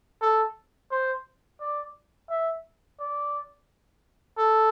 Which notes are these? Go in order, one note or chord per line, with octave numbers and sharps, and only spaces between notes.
A4
C5
D5
E5
D5
A4